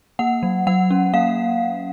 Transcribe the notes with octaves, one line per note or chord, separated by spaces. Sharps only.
A#3 F#5
F#3
F#3 F#5
C#4
A#3 F5